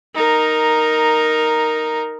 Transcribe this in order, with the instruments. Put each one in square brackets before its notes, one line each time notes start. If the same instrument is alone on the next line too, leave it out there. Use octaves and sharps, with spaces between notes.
[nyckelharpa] D#4 A#4